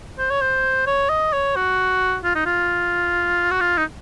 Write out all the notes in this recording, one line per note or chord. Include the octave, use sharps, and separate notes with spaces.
C5
C#5
C5
C#5
D#5
C#5
F#4
F4
D#4
F4
F#4
F4
D#4